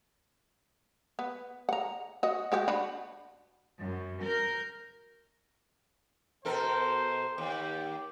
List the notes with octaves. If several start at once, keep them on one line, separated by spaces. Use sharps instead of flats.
B3
F#5 A#5
F#4 D#5
G#3 F#4 G4
D4 F#4 B5
F#2
A#4 G6
B2 A4 A#4 C5
D#2 G4